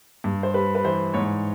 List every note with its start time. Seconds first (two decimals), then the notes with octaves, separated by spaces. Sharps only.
0.24 G2
0.43 C5
0.54 G3 B4
0.75 B4
0.84 E3 C5
1.14 G#2 C#5